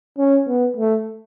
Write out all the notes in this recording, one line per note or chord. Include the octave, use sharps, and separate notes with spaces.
C#4
B3
A3